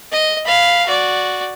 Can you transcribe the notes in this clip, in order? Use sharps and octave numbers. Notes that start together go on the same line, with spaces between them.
D#5
F5 B5
F#4 D5